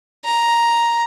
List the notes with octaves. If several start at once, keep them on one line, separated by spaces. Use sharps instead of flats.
A#5